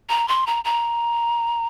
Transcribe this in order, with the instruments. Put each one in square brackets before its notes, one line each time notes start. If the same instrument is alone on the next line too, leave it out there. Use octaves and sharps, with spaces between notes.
[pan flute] A#5
C6
A#5
A#5